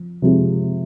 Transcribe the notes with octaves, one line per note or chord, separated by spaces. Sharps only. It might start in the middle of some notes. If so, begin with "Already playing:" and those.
Already playing: F3
C3 F3 G#3